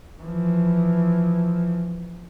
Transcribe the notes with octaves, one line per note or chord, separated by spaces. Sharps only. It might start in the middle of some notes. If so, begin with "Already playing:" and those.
E3 F3